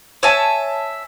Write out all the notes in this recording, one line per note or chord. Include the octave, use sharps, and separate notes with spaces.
C#5 E5 G#5 A5